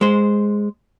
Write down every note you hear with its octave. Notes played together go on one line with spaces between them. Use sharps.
G#3 C5